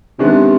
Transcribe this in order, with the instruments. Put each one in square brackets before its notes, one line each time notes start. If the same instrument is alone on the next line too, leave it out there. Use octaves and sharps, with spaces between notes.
[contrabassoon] C3 [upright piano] D#3 G#3 B3 D4